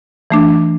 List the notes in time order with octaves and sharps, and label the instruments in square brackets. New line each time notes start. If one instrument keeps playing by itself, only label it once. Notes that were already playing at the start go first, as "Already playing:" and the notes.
[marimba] E3 A3 D4